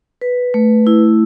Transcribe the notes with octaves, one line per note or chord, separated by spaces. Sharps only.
B4
A3
E4